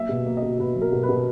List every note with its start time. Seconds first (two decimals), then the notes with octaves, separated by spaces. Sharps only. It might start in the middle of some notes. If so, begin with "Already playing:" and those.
Already playing: F#3 A#3 E5
0.09 B2
0.26 A#3
0.37 D#5
0.42 B2
0.59 B2 B4
0.76 F#3
0.82 A#4
0.92 B2
1.03 B4
1.09 B2